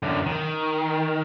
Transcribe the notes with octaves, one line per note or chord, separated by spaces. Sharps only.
F#2 D3
D#3